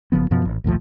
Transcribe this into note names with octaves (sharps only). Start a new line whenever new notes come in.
F#1 C#3 F3 B3
F#2 B2 F3 B3
A1
A#1 D#2 A2 F3